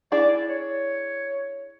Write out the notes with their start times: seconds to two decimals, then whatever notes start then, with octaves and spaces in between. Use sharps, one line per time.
0.12 D4 E4 G#4 D5
0.49 C#5